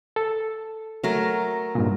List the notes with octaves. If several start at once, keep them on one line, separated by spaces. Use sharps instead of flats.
A4
F#3 A3 A#4
G2 A#2